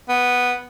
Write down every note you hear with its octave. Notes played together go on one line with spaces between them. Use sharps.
B3